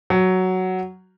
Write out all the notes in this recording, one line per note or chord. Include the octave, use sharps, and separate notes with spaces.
F#3